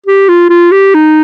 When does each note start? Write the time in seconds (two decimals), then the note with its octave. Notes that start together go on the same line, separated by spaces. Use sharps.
0.06 G4
0.29 F4
0.50 F4
0.72 G4
0.95 D#4